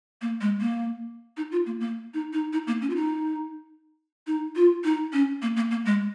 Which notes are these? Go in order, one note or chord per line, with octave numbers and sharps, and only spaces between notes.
A#3
G#3
A#3
D#4
F4
A#3
A#3
D#4
D#4
D#4
A#3
C#4
F4
D#4
D#4
F4
D#4
C#4
A#3
A#3
A#3
G#3